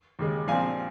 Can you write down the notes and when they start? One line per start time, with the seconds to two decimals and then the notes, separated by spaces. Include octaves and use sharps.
0.19 D#2 C#3 G#3
0.48 A#1 A#2 F3 C4 F5 G#5